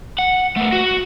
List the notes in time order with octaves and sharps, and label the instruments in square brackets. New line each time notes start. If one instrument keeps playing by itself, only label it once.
[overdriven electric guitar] F#5
A3 B3
F#4